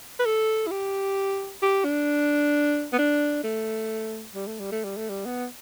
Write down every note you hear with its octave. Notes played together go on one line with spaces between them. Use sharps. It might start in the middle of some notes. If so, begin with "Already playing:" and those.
B4
A4
E4
G4
G4
D4
B3
D4
A3
G3
A3
G3
A3
G3
A3
G3
B3